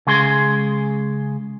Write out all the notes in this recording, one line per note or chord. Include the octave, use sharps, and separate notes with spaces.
C#3 G#3 G#4 C6